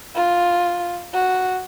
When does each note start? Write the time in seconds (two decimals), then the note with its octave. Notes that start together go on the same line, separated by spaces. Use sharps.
0.15 F4
1.14 F#4